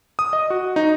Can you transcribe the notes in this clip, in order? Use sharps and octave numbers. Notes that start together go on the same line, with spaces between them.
D#6
D#5
F#4
D#4